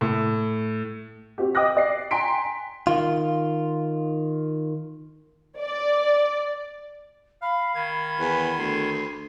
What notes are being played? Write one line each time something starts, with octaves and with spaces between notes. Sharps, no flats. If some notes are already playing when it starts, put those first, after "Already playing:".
A2
C4 F#4 G4
D#5 G5 D6 D#6 F#6 A#6
D5 C7
G5 G#5 A#5 C6 B6 D7
D#3 F4
D5
F5 B5
D#3 B5 G#6
E2 B4
D2 C6